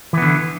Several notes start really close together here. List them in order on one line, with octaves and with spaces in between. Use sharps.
E3 B3 D3